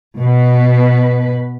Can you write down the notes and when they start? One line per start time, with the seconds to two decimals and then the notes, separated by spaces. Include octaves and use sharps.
0.20 B2 B4